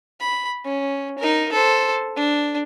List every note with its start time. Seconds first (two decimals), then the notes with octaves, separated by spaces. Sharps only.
0.20 B5
0.65 C#4
1.18 D#4 A#4
1.52 A4 C5
2.16 D4